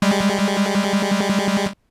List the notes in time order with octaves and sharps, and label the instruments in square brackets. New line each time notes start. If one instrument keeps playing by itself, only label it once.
[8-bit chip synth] G3 G#3